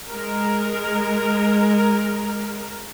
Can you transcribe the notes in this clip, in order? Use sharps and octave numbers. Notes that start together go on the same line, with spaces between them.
G#3 A#4